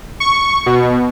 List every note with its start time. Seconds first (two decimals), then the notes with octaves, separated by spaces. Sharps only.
0.20 C#6
0.66 B2